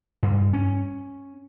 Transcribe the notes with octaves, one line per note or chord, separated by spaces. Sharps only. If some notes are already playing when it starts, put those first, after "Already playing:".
G2
C#4